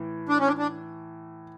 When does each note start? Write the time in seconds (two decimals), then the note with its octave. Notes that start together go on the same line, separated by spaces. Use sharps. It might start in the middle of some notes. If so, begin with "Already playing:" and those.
Already playing: A2 E3
0.29 D4
0.39 C#4
0.47 D4
0.59 D4